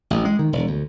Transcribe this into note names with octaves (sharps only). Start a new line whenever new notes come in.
A1
G#3
D#3
E1
D2